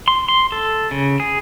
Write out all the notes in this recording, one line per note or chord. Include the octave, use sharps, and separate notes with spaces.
C6
C6
A4
C#3
G#4